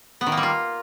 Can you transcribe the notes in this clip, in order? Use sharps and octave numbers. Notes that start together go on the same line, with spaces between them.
B3
D#3
A#3
G3
F4